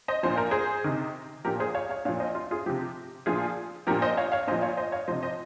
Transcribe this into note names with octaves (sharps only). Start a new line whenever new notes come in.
C5 D#5
A#2 F3 C5
A#4
G#4 C5
C3 D#3
A#2 F3 G4 A#4
G#4 C5
C#5 F5
C#5 F5
A#2 F3 C#5 F5
C5 D#5
F4
F4 G#4
C3 F3 G4
A#2 F3 F4 G#4
A#2 F3 G4 A#4
C5 D#5
C#5 F5
C#5 F5
A#2 F3 C5 D#5
C#5 F5
C5 D#5
C#5 F5
C3 F3 C5 D#5
C5 D#5